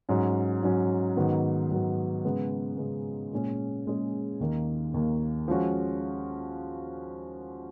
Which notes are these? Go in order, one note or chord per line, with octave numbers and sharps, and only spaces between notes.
G#2 F#3 C#4
G#2 F#3 C#4
G#2 D#3 F#3 B3
G#2 D#3 F#3 B3
C#3 G#3 B3
C#3 G#3 B3
A#2 G#3 C#4 G#4
A#2 G#3 C#4 G#4
D#2 D#3 A#3
D#2 D#3 A#3
F3 G#3 C#4 F#4